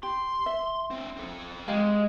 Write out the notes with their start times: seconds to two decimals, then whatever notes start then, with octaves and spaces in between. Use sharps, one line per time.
0.03 G4 C6
0.46 E5
0.91 C4 D4
1.17 C4 A4
1.68 G#3 G4 F5